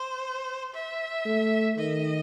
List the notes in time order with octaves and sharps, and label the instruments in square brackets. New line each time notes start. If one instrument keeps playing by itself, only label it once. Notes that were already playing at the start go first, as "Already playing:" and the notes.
Already playing: [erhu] C5
E5
[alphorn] A3
[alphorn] D#3 [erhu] D#5